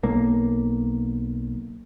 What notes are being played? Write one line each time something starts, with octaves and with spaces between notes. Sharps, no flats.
B1 A#3